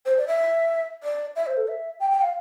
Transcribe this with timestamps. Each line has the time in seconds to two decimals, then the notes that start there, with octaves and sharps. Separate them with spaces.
0.05 C5
0.17 D5
0.27 E5
1.03 D5
1.35 E5
1.46 C5
1.57 A4
1.67 E5
2.00 G5
2.11 G5
2.21 F5